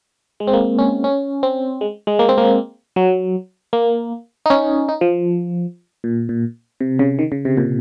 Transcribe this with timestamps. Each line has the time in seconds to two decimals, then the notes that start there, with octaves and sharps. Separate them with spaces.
0.40 G#3
0.47 C4
0.53 A#3
0.79 C#4
1.04 C#4
1.43 C4
1.81 G#3
2.07 G#3
2.19 A#3
2.29 C4
2.38 A#3
2.96 F#3
3.73 A#3
4.46 D#4
4.50 C#4
4.89 D#4
5.01 F3
6.04 A#2
6.29 A#2
6.80 C3
6.99 C#3
7.19 D#3
7.32 C#3
7.45 C3
7.57 A#2